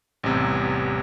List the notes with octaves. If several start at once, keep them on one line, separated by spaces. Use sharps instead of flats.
A1 E2 C3 G3